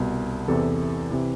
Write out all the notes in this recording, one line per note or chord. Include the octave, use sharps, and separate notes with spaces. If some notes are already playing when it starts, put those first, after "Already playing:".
Already playing: C2 B2
E2 C3 E3 A4
C3 E3